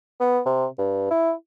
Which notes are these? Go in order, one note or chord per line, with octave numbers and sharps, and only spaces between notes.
B3
C3
G2
E4